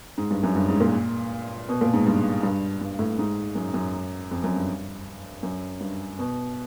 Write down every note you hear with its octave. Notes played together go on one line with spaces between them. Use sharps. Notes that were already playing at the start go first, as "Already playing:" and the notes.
G#2
G2
F#2
G2
G#2
A#2
B2
A#2
G#2
G2
G2
G2
A2
G#2
F#2
F#2
F2
F#2
G2
F#2
G2
B2